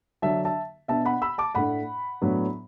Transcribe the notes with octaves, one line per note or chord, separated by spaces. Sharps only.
D3 F#3 D4 E5 A5
E5 A5
B2 B3 D4 E5 A5
F#5 B5
B5 E6
A5 D6
A2 A3 D4 F#5 B5
A2 F#3 B3 D4